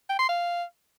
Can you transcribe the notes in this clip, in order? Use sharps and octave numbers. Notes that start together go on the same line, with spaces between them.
G5
C6
F5